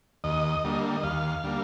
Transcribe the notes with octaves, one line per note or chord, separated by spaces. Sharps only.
D#2 D#5
D3 G3 A#3
D#5
D#2 F5
D3 G3 A#3